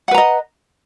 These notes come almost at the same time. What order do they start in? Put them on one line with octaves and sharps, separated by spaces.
F#5 B4 A#5 D#5